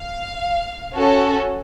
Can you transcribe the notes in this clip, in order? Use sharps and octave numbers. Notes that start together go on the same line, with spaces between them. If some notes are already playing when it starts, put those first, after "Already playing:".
Already playing: F5
C#4 F#4 A4